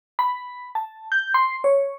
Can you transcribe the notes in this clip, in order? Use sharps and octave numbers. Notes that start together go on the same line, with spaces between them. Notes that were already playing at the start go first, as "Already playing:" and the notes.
B5
A5
G6
C6
C#5